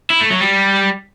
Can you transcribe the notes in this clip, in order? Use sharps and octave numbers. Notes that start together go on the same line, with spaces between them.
E4
A3
F#3
G3